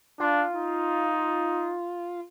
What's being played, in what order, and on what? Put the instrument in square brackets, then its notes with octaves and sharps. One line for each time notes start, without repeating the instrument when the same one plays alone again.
[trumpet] D4 [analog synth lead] F4
[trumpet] D#4